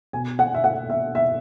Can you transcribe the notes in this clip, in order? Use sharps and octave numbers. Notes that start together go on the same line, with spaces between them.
B2 G#5
F#5
E5
F#5
E5
E5